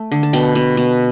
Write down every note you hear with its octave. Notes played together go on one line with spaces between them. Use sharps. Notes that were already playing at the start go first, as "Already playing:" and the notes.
Already playing: A3
D3
A5
B2 G5
B2
B2